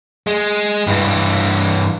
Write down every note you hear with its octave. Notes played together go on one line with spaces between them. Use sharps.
G#3
G2 E3